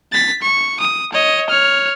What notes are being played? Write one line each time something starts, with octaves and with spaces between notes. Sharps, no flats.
A6 B6
C#6
D#6
C#5 D#5
C#5 F6